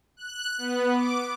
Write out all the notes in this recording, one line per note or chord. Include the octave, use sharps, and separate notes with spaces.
F#6
B3
D6